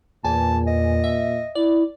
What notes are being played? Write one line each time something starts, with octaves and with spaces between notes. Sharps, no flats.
E2 A#2 G#5 A5
D#5
E5
E4 D5